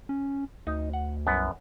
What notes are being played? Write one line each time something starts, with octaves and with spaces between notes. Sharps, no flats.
C#4
D2 D#4
F#5
C2 F#2 B3